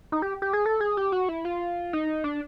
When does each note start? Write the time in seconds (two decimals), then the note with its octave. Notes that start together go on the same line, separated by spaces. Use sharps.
0.12 D#4
0.22 G4
0.42 G4
0.53 G#4
0.66 A4
0.80 G#4
0.97 G4
1.12 F#4
1.29 E4
1.45 F4
1.93 D#4
2.24 D4